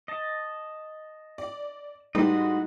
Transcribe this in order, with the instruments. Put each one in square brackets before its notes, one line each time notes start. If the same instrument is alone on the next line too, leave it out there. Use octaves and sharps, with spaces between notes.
[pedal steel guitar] D#5 A5
[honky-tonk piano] D5
[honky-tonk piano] A2 G#3 B4 [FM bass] G3 [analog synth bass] D#4 [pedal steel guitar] F#4 D#5